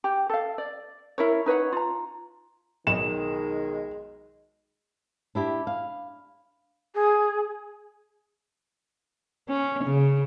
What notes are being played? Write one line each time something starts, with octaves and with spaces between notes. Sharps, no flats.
G4
A4 F5
D5
E4 A#4 C#5
D#4 B4 C#5 F#5
F4 A#5
B1 D#3 G#3 D#5 E7
D4 E4 G4
F5
G#4
C#4
C#3